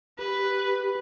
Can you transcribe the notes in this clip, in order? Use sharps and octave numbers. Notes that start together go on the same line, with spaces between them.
G4 B4